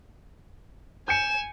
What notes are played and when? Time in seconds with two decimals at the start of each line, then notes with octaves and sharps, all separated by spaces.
1.08 G#5 G6 C#7 E7